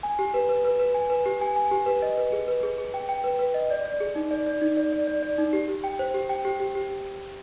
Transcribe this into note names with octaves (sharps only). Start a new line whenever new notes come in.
G#5
G4
B4
B4
B4
B4
G#5
B4
G4
G#5
G#5
G4
B4
D#5
B4
G#4
B4
G#4
G#4
G5
G5
B4
B4
D#5
D5
D5
G#4
D#4
D5
D5
D#4
D5
D5
D5
D5
D#4
G4
G4
G5
C5
G4
G5
G4
G4
G4